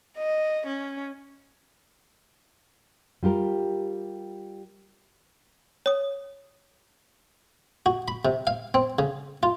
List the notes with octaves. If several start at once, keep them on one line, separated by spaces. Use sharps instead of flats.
D#5
C#4
G3 F4 G4 A#4
C#5 D#6
F#4
B5
C3
F5
C4
C#3
F4